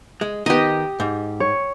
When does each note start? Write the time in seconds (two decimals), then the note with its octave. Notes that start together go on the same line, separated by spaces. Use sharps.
0.21 G#3
0.46 D#3 B3 G4 D#5
1.00 G#2
1.40 C#5